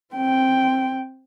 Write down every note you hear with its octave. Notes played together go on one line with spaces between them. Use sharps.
C4 G5